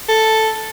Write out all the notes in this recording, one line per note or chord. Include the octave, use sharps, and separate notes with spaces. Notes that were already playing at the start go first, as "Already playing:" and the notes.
A4